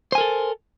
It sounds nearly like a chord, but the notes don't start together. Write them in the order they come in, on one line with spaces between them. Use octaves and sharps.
C5 G#5 A#4 A4